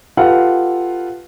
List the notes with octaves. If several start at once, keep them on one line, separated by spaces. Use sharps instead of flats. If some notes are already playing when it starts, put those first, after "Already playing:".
F4 G4 A4 B4 F5 F#5